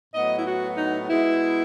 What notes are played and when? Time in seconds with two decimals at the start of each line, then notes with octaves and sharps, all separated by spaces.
0.14 A2 F#3 B3 D#5
0.39 E4
0.46 F#4
0.77 D#4
1.09 B2 G#3 B3 E4